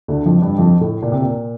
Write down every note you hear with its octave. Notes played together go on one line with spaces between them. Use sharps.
D2 D3
F2 F3
G2 G3
F2 F3
A2
A#2
C3
A#2